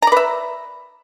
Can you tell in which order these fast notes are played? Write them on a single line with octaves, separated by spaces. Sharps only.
A#5 D5 B4 E5